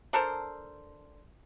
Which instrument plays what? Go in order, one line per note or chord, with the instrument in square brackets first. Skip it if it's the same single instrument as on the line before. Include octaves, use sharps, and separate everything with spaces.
[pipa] D4 A4 A#4 C5